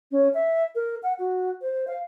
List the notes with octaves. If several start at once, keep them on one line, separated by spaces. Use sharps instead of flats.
C#4
E5
A#4
F#5
F#4
C5
F5